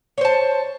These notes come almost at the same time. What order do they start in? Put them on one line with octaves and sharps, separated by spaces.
C#5 C5 A5